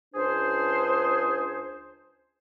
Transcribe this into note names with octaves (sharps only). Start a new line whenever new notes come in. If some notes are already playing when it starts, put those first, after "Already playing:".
C#2 D4 G#4 C5